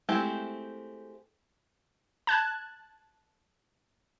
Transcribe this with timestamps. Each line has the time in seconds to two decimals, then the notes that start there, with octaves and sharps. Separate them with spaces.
0.09 G#3 A3 C4 E4 G4
2.27 A5 F#6 G#6